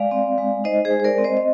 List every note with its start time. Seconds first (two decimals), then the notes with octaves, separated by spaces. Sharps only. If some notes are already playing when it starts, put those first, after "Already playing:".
Already playing: G#3 D5 F5
0.11 C4
0.38 G#3
0.64 D#4 C5 D#5
0.85 G#4 C5
0.91 G#3
1.00 C5
1.04 A#4 D5
1.18 C4
1.24 C5 D#5
1.37 D#5